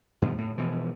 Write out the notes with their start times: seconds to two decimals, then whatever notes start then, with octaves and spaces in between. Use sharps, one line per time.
0.22 G2 B2 D#3 F3
0.38 A2
0.58 B2 E3 F3